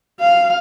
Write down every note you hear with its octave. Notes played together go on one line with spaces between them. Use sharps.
F5